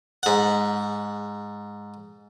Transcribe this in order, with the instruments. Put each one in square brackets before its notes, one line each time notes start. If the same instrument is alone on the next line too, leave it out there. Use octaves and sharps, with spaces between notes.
[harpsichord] G#2 F#5